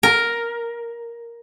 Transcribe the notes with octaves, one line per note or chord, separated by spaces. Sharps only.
A#4